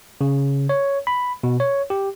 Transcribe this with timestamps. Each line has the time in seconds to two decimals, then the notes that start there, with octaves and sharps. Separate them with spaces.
0.21 C#3
0.69 C#5
1.07 B5
1.43 B2
1.60 C#5
1.90 G4